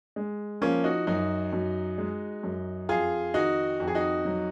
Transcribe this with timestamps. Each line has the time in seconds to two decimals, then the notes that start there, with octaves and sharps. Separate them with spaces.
0.16 G#3
0.61 F3 A#3 C#4
0.84 D#4 F#4
1.07 F#2 D#4 F#4
1.52 F#2
1.98 G#3
2.43 F#2
2.89 F2 F4 G#4
3.34 D#3 D#4 F#4
3.80 F2 F#4
3.88 G#4
3.95 D#4 F#4
4.25 F#3